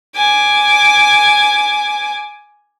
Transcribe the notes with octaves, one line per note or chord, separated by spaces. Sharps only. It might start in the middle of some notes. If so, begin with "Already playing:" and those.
G#5 D6